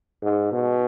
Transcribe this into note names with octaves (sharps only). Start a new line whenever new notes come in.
G#2
B2